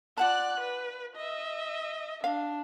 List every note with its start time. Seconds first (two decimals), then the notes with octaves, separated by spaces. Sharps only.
0.17 F4 D5 F#5 A5 F#6
0.60 B4
1.16 D#5 E5
2.24 D4 F5